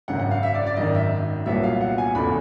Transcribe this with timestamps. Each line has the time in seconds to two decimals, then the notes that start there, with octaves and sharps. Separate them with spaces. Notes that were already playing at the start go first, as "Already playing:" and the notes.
0.08 G#1 F#2 C#3 F#5
0.20 F#5
0.31 F5
0.43 E5
0.54 D5
0.66 D5
0.77 G#1 F#2 D#3 D#5
0.95 E5
1.46 C2 A#2 F#3 B3 E5
1.64 F5
1.81 F#5
1.98 G#5
2.15 E1 E2 C#3 E3 A3 B5